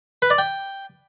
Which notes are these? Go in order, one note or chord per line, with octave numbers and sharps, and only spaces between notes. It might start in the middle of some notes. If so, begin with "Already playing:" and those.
B4
D5
G5